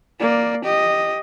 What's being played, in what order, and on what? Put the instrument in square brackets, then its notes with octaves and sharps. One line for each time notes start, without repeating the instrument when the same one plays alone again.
[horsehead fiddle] A#3 D5
G4 D#5